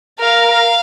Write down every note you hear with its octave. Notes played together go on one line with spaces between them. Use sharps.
A#4 F5